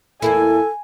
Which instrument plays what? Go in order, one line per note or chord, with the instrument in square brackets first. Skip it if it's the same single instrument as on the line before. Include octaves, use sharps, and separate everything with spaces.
[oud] E2 A#3 E4 [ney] A4 [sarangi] G#5